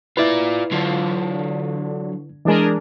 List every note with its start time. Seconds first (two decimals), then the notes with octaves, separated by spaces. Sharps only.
0.17 E4 F4 B4 D5
0.72 D3 F#3 F4
2.45 E3 G#3 D4 G#4 A#4